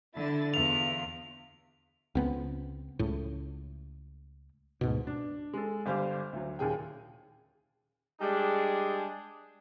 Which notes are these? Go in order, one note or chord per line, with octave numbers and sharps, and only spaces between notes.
D3 E4 A6
E2 F4 F7
C#2 B3 C4
C#2 A2
D2 G#2 B2
D4
G#3 A4
G1 G3 C5 F5 G#5 D6
D2 F#3
D#2 A#2 G#4 G5
G3 G#3 D4 G#4